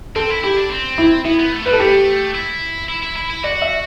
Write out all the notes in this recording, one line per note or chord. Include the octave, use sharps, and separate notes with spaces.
C4 A4
E4
E4 G4
D4
C4
E4
B3 E4
B3
A3
G3 B4
A4
A3 G4
E4
E4
E4
E4
E4
F#4 D5
E5